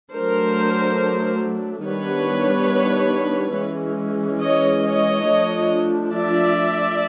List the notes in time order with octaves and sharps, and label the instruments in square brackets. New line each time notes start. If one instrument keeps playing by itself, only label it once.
[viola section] F#3 A3 D4 A#4 C5
D#3 G3 B3 D4 B4 C#5
E3 G#3 C#4
C#5 D#5
C#5 D#5
F3 A3 D4
D5 E5